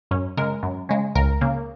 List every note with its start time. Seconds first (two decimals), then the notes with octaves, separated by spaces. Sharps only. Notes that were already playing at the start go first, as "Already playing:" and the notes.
0.11 F#2 C#4
0.37 C#3 G#3 A#4
0.63 F#2
0.89 C#3 G#3
1.15 C#2 A#4
1.41 C#3 A#3